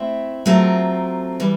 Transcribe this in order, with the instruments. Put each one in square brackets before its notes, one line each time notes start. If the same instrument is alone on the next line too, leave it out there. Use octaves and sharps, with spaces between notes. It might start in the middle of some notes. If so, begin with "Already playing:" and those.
Already playing: [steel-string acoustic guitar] A3 C4 E4
F#3 A3 C4 F4 A#4
E3 G3